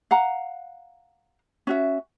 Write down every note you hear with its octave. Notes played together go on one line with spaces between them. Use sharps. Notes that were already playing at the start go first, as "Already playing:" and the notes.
F5 F#5 A#5
C#4 F#4 E5